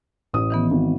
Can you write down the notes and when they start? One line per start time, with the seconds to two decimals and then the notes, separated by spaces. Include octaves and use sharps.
0.33 A1 D#6
0.50 D#3 E3 B3
0.71 G#1